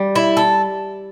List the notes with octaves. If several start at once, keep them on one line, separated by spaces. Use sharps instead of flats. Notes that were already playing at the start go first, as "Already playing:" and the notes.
Already playing: G3
E4
A4